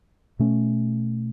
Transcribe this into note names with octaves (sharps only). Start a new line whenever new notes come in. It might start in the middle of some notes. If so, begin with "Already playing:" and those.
B2 A3 C#4